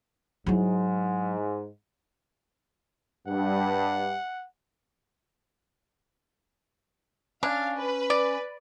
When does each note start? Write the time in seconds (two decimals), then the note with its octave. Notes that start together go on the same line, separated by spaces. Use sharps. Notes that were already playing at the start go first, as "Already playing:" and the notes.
0.46 G#2 F#3 E4
3.27 G2 F#5
7.43 C#4 D4 F5
7.78 B4
8.10 D5